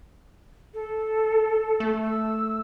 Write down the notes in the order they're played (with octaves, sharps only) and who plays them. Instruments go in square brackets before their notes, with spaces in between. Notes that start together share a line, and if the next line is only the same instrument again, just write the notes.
[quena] A4
[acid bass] A3
[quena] E6